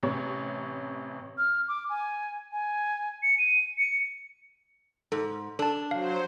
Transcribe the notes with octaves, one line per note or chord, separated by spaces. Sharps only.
A1 C3 C#5
F6
D6
G#5
G#5
C#7
D#7
C#7
G#2 A4
D4 A4 A5
F#3 C5 F5